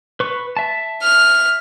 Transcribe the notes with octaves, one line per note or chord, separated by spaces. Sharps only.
B4 C#6
E5 A5
F6